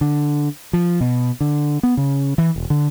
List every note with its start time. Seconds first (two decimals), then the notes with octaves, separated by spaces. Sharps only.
0.01 D3
0.73 F3
1.01 B2
1.41 D3
1.83 B3
1.97 C#3
2.38 E3
2.56 E1
2.70 D3